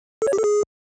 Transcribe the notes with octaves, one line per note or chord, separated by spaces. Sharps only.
A4
C#5
G4
A4
G#4